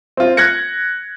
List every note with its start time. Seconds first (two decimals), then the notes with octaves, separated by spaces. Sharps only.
0.17 C4 F4
0.37 F#6 G#6 A#6 C#7